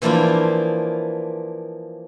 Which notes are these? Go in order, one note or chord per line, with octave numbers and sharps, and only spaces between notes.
E3 F3 A#3 D4 E4 F4